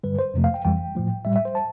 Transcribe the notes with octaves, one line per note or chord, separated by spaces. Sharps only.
G2 D3 G3 B4
C5
F2 C3 F3 A3
F5
G5
F2 E3 G3 G5
A2 F3 A3
A2 G3 E5
E5
C5
A5